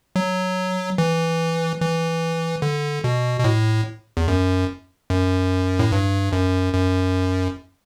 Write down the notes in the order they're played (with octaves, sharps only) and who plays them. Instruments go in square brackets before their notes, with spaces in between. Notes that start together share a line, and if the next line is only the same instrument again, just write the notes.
[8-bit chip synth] F#3
E3
E3
D3
B2
B2
A2
E2
F#2
F#2
A2
G2
F#2
F#2